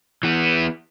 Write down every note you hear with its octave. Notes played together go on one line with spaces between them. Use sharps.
E3 B3